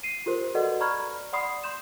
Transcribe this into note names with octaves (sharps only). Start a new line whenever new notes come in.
C7 D#7
F4 G4 A#4 C5
F#4 A4 B4 D5 D#5 F#5
D5 A#5 B5 C#6 F6 G#6
D5 F#5 B5 C6 D#6 C7
C6 G6 E7